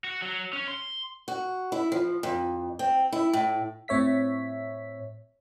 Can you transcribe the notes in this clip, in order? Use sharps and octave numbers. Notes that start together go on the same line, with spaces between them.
F#4
F#3
C#4
C6
F#4
E4
F3
F2
C4
E4
A2
A2 C4 C#5 E5 B6